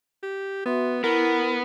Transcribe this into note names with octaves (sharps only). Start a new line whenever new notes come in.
G4
B3 F#4 E5 C6
B3 E4 A#4 B5 C#6